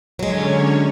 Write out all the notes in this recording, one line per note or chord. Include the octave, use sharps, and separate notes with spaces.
D3 F#3 G#3 C#4 C#5